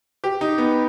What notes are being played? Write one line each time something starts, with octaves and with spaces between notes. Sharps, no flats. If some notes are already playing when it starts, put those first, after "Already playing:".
G4
D#4
B3